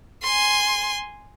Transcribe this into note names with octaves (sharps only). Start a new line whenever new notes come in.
G#5 C6